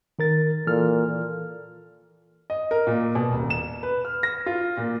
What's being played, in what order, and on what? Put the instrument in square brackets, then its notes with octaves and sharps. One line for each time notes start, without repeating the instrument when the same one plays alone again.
[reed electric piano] D#3 A#4 A6
[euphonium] A#2 [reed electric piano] E3 A4 F6
[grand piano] D#5
A#4
A#2
B2
D#1
E7
B4
F6
A#6
F4
A#2